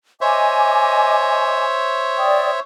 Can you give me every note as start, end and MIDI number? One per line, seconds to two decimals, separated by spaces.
0.21 2.60 72
0.21 2.60 73
0.21 1.64 75
0.21 2.60 76
0.21 1.64 80
0.21 1.64 86
2.18 2.50 74
2.18 2.50 79
2.18 2.50 87